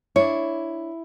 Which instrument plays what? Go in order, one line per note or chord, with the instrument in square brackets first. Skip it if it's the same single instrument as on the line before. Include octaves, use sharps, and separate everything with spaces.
[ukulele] D4 C#5 [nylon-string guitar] E4